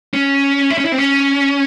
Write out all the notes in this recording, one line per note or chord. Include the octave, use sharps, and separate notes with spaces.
C#4
E4
C#4
E4
C4
C#4